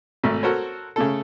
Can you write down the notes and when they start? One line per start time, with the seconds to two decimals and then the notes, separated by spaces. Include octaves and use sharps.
0.24 G#1 A3 E5
0.43 F#4 A4 A#4 C5 C#5
0.96 C#3 A3 A4